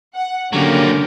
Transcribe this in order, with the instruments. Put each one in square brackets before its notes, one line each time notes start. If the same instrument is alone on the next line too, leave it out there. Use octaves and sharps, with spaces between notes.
[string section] F#5
[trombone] D3 [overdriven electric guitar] F#3 A#3 [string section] C#4 G4